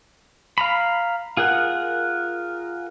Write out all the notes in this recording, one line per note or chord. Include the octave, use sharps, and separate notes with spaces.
F5 A#5 B5
F4 G#4 A#4 F#5